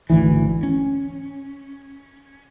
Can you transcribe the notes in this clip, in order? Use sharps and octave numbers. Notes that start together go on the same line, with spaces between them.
G#1 D2 E3
C#4